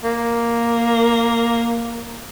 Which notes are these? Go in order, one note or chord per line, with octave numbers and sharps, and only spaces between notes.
A#3